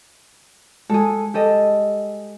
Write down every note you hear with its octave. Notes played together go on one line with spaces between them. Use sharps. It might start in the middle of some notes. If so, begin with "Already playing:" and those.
G#3 G#4 A4
G4 A4 D#5